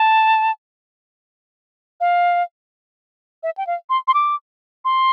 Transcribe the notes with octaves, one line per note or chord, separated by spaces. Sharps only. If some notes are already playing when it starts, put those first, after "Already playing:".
Already playing: A5
F5
E5
G5
F5
C6
C6
D6
C6